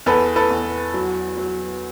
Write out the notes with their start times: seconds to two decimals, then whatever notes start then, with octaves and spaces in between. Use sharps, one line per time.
0.06 E2 A4 B4
0.36 A4 B4
0.50 E2
0.94 F#3
1.37 F#3